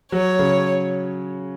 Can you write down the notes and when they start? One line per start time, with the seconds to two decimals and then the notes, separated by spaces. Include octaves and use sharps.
0.12 F#3 C#5
0.39 C#3